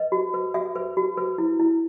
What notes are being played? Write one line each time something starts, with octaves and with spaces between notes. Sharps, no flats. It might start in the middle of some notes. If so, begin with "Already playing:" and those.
Already playing: B4 D#5
F#4
B4
F#4 E5
B4
F#4
B4
E4
E4